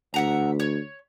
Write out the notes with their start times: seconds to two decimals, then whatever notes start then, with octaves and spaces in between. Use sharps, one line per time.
0.14 D2 E5 F#5 A#5
0.60 C#5